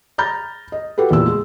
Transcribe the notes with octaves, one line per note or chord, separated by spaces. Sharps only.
A#5 B5 F6 G6 A6
D#5
F#4 G4 A4 B4
E2 A#2 E6
G#3